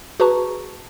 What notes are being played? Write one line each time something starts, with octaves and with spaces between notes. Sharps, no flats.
F#4 G#4 B4 A5 A#5 C#6